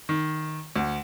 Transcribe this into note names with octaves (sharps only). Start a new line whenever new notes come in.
D#3
D2